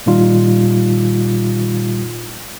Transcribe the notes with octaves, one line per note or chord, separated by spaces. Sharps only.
A#2 D#3 G3 D#4 F4